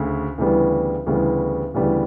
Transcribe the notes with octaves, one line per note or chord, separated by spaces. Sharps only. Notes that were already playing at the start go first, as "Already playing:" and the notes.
Already playing: D2 C#3
D2 C#3 E3 G3 B3
D2 C#3 E3 G3 B3
D2 C#3 E3 G3 B3